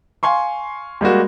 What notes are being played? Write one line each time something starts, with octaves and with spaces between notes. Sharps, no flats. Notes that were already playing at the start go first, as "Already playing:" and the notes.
F5 G#5 C6 C#6
G3 G#3 A#3 F#4